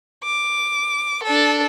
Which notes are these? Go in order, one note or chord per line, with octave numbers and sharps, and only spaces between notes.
D6
D4 A4